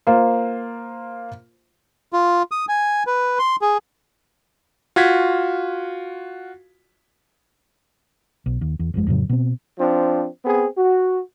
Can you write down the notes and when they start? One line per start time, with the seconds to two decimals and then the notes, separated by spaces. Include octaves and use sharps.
0.07 A#3 F4 C5
2.13 F4
2.51 D#6
2.69 G#5
3.07 B4
3.39 C6
3.61 G#4
4.96 F4 F#4 G#6 B6
8.46 B1
8.61 D#2
8.79 E2
8.94 G1 F2 A#2 G#3
9.07 F2 A2 C#3 F#3
9.29 B2 C4
9.79 F3 C4 D4
10.44 B3 C4 G#4
10.77 F#4